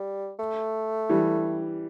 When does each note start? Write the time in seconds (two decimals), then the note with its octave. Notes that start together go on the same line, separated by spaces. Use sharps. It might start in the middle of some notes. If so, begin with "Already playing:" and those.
Already playing: G3
0.39 A3
1.09 E3 G3